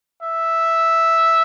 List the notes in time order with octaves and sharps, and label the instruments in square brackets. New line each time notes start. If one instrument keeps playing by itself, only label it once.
[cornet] E5